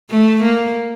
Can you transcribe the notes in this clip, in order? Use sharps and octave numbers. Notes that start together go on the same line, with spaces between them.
A3
A#3